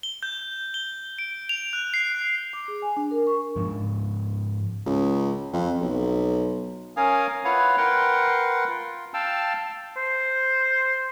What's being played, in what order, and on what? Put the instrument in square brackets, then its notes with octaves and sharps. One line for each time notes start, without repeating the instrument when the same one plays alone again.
[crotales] G7
G6
G7
D7
F7
F#6
C7
[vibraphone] D6
G#4
G#5
D4
A#4
C#6
[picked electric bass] G#2 F3
[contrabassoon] C#2
F2
B1
[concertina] C#4 A#4 F5 G#5 D#6
E4 F4 B4 C#5 F5 F#5
A#4 B4 F#5 G5 C6
F4
F5 G5 A5 E6
[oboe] C5